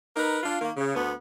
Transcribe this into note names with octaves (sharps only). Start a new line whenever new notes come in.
D#4 A#4 B4
D4 F4
D#3 A#3
C#3
D2 B3